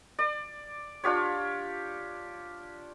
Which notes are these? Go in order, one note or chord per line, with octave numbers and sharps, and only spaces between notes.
D5
D4 F4 G4 C#5